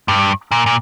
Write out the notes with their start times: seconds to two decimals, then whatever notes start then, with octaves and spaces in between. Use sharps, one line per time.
0.08 G2
0.52 A#2
0.66 A#2